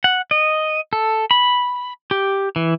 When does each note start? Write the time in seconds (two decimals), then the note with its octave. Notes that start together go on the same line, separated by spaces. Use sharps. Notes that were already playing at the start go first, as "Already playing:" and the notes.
0.04 F#5
0.31 D#5
0.93 A4
1.31 B5
2.11 G4
2.56 E3